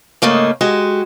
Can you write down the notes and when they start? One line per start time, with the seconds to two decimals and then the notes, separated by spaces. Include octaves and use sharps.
0.22 G#2 C#3 A3 A#3 D#4
0.61 G#3 F#4 G4